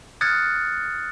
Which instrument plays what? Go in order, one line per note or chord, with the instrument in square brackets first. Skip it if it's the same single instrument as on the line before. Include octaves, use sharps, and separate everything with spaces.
[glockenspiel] D#6 F6 F#6 G#6 A6 C#7